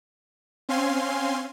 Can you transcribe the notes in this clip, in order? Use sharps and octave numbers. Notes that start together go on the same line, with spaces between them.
C4 C#4 F5 G#5 C6